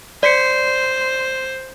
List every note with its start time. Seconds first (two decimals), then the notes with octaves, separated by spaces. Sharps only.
0.23 C5 D5 B6 C#7